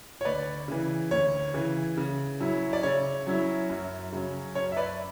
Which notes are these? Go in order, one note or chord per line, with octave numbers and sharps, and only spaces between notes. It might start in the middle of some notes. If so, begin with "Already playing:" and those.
C#5
D2 B4 D5
C#3 E3
D2 C#5
C#3 E3
C#3
F#3 C#4 E4
D5
C#3 C#5
F#3 C#4 E4
F#2
C#3 F#3 C#4
F#2 C#5
E5
B4 D5